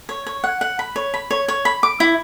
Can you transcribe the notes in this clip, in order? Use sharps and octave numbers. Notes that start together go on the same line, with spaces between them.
C#5
C#5
F#5
F#5
B5
C#5
B5
C#5
C#5
B5
D6
E4